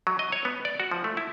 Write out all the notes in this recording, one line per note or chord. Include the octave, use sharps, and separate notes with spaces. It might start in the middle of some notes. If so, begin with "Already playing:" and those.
F#3
D#5
C#5
B3
D5
F#4
F3
A3
E4